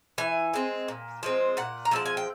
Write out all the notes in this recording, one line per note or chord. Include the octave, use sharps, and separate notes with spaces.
E3 G#5
G#3 C4
A#2
F3 G#3 C4
A#2 F#5
A#5
F3 G#3 C4 A5
G#5
G5